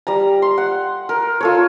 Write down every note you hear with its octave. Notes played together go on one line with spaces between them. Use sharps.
G3 A#5
C6
F#5
A#4
F4 A4 C#5